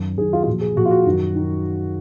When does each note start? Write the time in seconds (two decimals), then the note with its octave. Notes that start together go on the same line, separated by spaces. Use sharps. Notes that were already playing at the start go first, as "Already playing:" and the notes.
Already playing: F#2 D#3
0.17 F#2 G#4
0.20 D#3
0.33 F4
0.43 F4
0.46 A#2 F3 F#4
0.61 G#4
0.76 A#2 F3 F#4
0.85 F4
0.91 F#4
1.06 F#2 D#3
1.35 D#3